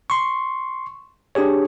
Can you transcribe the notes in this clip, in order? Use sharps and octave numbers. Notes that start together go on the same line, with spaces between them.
C6 C#6
D4 G4 G#4 C#5